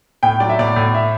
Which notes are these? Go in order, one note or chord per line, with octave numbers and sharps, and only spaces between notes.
A2 G5
F#3 D5
E5
A2 D5
A2
E5